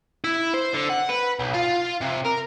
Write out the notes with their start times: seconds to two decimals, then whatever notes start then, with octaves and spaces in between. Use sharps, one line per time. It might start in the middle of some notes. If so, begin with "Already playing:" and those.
0.24 E4
0.54 C5
0.74 D3
0.89 F#5
1.09 B4
1.40 B1
1.54 F4
2.02 C3
2.26 A#4